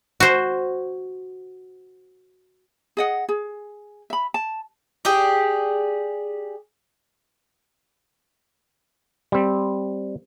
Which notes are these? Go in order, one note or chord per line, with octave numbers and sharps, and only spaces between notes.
F#4 C5
G#4 D#5 F#5
G#4
E5 B5
A5
G4 G#4 D5
G3 C4